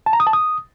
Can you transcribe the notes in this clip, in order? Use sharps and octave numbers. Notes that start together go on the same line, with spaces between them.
A5
A#5
D#6
A5
D#6